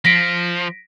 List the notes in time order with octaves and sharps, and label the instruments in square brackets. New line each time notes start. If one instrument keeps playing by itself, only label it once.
[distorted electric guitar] F3 [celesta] A#6 B6 D7